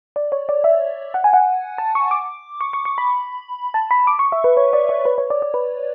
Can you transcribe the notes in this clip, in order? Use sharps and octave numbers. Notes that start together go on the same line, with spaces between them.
D5
C#5
D5
E5
F#5
G#5
F#5
A5
C#6
D6
C#6
C#6
C#6
B5
A5
B5
D6
C#6
E5
B4
C#5
D5
C#5
B4
C#5
D5
D5
B4